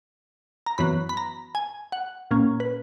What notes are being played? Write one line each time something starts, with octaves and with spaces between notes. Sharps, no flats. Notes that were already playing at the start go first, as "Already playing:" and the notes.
A#5
F#2 E3 B3 B5
B5
A#5
G#5
F#5
A#2 A#3 C#4
B4